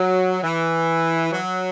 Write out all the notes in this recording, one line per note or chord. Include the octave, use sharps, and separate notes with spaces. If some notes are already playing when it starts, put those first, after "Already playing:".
Already playing: F#3
E3
F#3